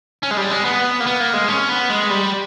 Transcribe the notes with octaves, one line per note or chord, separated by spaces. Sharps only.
C#4
G#3
G3
G#3
B3
A#3
B3
A#3
G#3
C#4
B3
G#3
G3